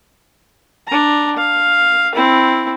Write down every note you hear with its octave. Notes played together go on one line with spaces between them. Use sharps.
D4 A#5
F5
C4 E4